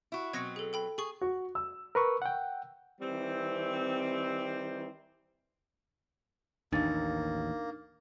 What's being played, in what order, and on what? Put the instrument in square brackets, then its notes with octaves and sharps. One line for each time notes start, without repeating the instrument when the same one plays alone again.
[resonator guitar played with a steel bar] E4 F#4
[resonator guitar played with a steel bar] B2 F#3 C4 [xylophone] G#6 A#6 C#7
[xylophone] G#4 A4
A4 G5 B5
[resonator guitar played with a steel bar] G#4 [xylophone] C#6 F#7
[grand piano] F#4
E6
[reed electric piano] A#4 B4 C#6
F#5 G5
[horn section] D#3 E3 G3 C4
[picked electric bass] A1 D#2 [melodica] A#3 [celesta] D4 D#4 A6